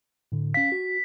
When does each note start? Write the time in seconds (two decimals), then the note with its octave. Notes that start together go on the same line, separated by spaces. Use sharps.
0.32 A2 D3
0.54 C#4 F5 B6
0.72 F#4